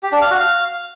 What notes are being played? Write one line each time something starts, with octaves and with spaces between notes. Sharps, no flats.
G4
D4
F5
F#4
F5